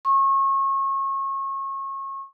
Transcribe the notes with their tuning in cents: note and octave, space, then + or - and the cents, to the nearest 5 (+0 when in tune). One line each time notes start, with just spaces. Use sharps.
C#6 -30